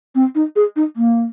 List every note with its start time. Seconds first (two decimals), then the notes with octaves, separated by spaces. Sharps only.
0.15 C4
0.35 D#4
0.56 G#4
0.76 D#4
0.96 A#3